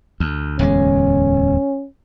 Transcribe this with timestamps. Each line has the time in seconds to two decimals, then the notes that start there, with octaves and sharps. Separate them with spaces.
0.20 D2
0.59 D1 E2 G#3 C#4